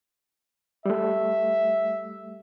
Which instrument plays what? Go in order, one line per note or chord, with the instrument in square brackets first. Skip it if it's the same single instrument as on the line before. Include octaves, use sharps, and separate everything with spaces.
[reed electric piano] G3 A3 [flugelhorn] E5